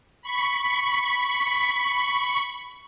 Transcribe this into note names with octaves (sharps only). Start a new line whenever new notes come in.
B5 C#6 B6